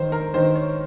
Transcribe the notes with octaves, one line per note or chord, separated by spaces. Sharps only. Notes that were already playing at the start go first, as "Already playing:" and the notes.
Already playing: D#3 C5
A#4
D#3 C5
C#5